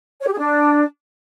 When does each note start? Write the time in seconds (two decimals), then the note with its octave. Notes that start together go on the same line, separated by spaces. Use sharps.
0.22 C#5
0.27 G4
0.33 G#4
0.39 D4